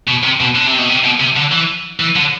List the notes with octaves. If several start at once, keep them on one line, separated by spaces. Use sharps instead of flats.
B2
C3
B2
D3
C3
B2
C3
B2
C3
D3
E3
E3
D3